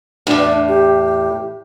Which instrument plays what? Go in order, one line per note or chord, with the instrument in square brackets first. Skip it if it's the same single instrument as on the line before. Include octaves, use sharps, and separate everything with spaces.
[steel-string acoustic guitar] E2 A2 [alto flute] D4
[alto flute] G4